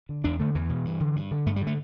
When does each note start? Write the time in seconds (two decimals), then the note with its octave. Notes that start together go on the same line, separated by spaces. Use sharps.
0.09 D3
0.24 E2 D4
0.40 D3 A3
0.55 E2 E3
0.69 B2
0.85 G2
1.00 D3
1.16 G2
1.31 D3
1.46 G2 A3
1.56 G3
1.62 D3
1.67 A3